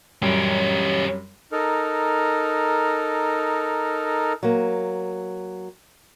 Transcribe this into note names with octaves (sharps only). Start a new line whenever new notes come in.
F#2 G3 C#4 G4
D#4 A4 A#4
F#3 A#3